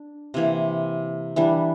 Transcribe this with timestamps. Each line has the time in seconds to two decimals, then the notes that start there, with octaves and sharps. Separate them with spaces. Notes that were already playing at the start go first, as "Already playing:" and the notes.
Already playing: D4
0.34 C3 E3 A#3
1.36 E3 G3 D4